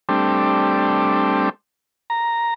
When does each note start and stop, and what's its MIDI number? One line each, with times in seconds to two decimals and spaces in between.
0.09 1.49 55
0.09 1.49 57
0.09 1.49 60
0.09 1.49 62
2.10 2.54 82